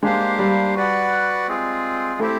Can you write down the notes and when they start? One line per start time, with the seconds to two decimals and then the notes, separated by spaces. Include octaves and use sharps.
0.02 G#3 A#3 D4 G4 C5 F5
0.39 G3
0.75 F#4 B4 D5 F#5
1.48 G#3 C4 F4 G#4
2.20 A3 C4 E4 G4 C5